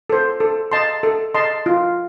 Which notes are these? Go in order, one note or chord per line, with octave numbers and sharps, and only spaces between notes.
A4 C5
A4
D#5 A5 C6
A4
D#5 A5 C6
F4